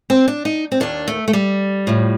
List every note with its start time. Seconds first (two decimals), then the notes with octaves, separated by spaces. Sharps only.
0.10 C4
0.28 D4
0.45 D#4
0.72 C4
0.80 D#2 D#3 D4
1.08 A3
1.28 A3
1.33 G3
1.87 A2 F3